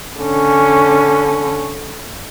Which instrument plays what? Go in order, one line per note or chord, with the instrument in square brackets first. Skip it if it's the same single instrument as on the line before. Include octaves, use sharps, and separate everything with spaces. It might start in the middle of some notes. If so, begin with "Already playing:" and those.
[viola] D3 C#4